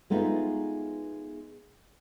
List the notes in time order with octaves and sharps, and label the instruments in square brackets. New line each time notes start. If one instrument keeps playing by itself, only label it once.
[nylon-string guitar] G#3 A3 B3 D#4 F4